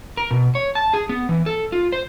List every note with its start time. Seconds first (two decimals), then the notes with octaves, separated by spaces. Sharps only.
0.17 A#4
0.31 B2
0.55 C#5
0.75 A5
0.94 G#4
1.09 B3
1.29 E3
1.46 A4
1.72 F4
1.92 C5